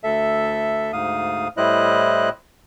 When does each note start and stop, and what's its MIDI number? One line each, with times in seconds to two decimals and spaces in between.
0.04 0.92 38
0.04 0.92 69
0.04 0.92 76
0.93 1.48 38
0.93 1.48 44
0.93 1.48 77
0.93 1.48 87
1.57 2.29 45
1.57 2.29 55
1.57 2.29 64
1.57 2.29 72
1.57 2.29 75
1.57 2.29 90